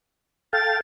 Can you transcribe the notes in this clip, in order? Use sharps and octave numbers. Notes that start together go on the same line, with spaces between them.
A4 F5 G5 A6